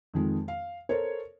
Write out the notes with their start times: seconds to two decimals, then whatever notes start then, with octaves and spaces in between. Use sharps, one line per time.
0.14 F2 D#3 G#3
0.48 F5
0.89 A4 A#4 C5 C#5